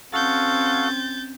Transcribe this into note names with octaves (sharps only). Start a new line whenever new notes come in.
C4 C#4 F#4 A4 F5 F#5 G6 A6